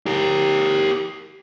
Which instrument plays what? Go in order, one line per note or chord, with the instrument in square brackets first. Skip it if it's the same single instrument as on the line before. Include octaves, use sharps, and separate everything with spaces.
[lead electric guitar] G4 A#4